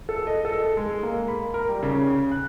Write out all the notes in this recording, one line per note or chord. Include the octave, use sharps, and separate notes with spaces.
A4
D#5
A4
G#3
A#3
B5
A#4
G3
C#3
F#6